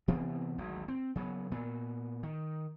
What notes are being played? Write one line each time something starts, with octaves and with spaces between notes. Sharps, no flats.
C3 E3 B3 C4
G#1 D2 F#3
C4
C#3 F#3 A3 B3
A#2 B3
D#3